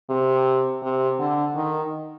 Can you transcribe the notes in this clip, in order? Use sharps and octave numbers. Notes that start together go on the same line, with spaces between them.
C3
C3
D3
D#3